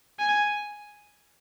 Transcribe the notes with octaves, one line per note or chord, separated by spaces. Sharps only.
G#5